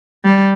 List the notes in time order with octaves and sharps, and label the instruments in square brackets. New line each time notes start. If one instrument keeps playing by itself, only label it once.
[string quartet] G3